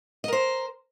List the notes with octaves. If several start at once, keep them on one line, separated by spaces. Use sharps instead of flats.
A#4 C5 D#5